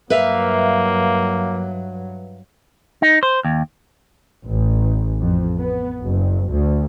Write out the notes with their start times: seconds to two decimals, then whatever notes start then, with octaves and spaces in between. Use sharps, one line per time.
0.10 G2 F#3 A#3 B4 E5 F5
3.02 D#4
3.23 C5
3.45 D#2
4.46 A1
5.20 F2
5.59 B3
6.02 F#1
6.50 D2